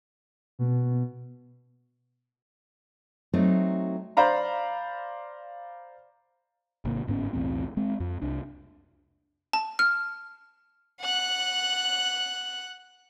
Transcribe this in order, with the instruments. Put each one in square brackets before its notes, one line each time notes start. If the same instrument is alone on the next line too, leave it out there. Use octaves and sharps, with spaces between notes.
[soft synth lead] B2
[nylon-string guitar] F#3 A3 C4 D#4
[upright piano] C5 D5 F5 A#5 B5
[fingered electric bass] G#1 C3 A#3
G1 G#2 B3 C#4
B1 E2 A2 C4
G#3 C4
F2
C2 D4
[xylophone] A5
F6
[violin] F#5 F#6